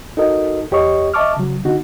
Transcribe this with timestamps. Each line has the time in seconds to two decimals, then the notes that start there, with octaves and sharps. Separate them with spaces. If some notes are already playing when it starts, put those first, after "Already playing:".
0.17 D#4 F#4 A4 A#4 D#5
0.71 E2 G4 C#5 D#5 C#6
1.14 D#5 E5 A5 C#6 D6 F6
1.37 C#3 F#3
1.65 D3 B3 D#4 F#4